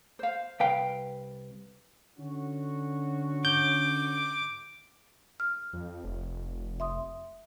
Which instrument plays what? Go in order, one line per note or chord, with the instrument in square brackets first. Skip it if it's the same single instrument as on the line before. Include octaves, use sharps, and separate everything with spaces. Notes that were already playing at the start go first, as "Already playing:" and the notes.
[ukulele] C5 F5
[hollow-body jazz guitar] C2 B4 G5 [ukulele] F5
[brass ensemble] D3 C#4 F#4
[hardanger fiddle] D6 [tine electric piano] G6
[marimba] F6
[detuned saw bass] F2
F1
[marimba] E5 C6 D#6